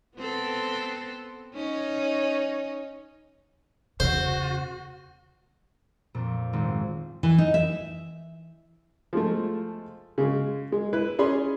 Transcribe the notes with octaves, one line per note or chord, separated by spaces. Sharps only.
B3 C4 A4
C#4 D#4 C#5
E2 C#3 F#4 C5
F2 A#2
G#1
E3
D#4
E5
F3 G#3 A3
C#3 G#3
G#3
E4 B4
C#4 G#4 D5 B5 C6